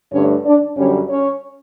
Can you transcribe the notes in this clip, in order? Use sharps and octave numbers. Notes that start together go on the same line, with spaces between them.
G2 D3 A3 C#4 C#5
D4 D5
F#2 D3 G3 C#4 C#5
C#4 C#5